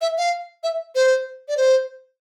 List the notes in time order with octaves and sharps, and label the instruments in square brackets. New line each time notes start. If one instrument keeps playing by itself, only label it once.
[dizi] E5
F5
E5
C5
D5
C5